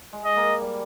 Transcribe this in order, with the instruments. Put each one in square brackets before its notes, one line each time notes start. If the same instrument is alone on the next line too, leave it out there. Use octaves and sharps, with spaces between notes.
[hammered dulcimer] G#3
[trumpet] D#5
[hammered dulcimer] A#3
G3